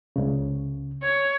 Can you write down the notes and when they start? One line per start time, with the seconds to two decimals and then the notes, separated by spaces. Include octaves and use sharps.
0.16 C#2 C#3
1.03 C#5